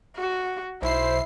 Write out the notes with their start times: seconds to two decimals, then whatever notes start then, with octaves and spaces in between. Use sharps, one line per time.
0.17 F#4
0.82 B1 E4 C5 C7